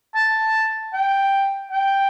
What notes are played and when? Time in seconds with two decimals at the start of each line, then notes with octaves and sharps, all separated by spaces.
0.15 A5
0.93 G5
1.72 G5